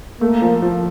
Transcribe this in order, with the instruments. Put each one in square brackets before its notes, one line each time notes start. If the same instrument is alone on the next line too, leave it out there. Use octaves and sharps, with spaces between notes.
[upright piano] A3 [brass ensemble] A#3
[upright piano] F3
F3